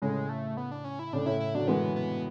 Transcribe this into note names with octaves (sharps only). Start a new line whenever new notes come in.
A2 C#3 G#3
A3
B3
D4
C#4
E4
A2 C#3 D4
A2 E4
E4
D3 F#3 D4
E3 G#3 B3
B3